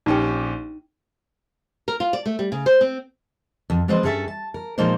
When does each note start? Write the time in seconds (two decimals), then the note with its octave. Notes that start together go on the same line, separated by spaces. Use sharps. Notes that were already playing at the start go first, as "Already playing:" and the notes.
0.06 A#1 C#4 D#4 G4 G5
1.88 A#4
2.00 F4
2.13 D5
2.26 A3
2.39 G3
2.52 C#3
2.66 C5
2.81 C4
3.70 F2
3.88 F3 G#3 C4 B4 C5 D#5
4.03 G2 C#4 G#4 A4 E5 A5
4.28 A5
4.54 A#4
4.78 A#2 F3 G#3 A#3 D#4 C5